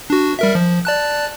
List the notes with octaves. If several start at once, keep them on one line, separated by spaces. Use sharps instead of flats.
D4 F#4
G3 A#4 E5
F3
D5 A5 F#6